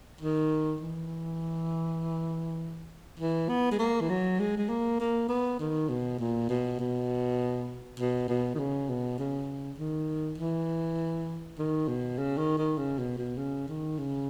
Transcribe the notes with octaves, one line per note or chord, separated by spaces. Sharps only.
D#3
E3
E3
B3
G#3
A#3
E3
F#3
G#3
G#3
A#3
A#3
B3
D#3
B2
A#2
B2
B2
B2
B2
D#3
C#3
B2
C#3
D#3
E3
D#3
B2
C#3
D#3
D#3
C#3
B2
B2
C#3
D#3
C#3